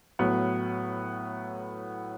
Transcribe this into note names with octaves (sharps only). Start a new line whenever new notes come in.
A2 F#3 B3